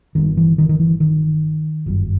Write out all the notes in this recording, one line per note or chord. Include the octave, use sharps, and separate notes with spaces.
G1 G2 D#3
E3
D#3
D#3
E3
D#3
G1 F#2